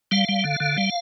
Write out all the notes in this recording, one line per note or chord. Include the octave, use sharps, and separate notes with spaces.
G3 F5
G3
D3
D3
G3